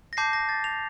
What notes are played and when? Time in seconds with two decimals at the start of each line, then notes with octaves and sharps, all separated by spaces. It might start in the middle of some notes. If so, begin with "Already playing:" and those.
0.13 A#6
0.17 A5 D6 G6 C7
0.33 A#6
0.49 A6
0.64 F7